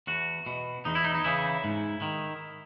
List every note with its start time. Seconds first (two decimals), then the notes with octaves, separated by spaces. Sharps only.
0.07 E2 F#4
0.46 B2
0.85 E2 D#4
0.95 E4
1.04 D#4
1.15 D#4
1.24 C#3 E3 E4
1.64 G#2
2.02 D#3